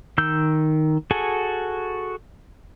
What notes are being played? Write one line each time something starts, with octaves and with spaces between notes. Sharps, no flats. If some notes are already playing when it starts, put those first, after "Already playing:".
D#3 E6 G6
F#4 G#4 A4 G#5